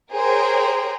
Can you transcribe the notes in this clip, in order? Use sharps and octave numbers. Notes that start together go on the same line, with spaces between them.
G#4 A#4 C5 C#5 G5